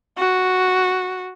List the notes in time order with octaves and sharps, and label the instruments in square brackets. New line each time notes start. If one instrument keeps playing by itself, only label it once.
[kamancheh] F#4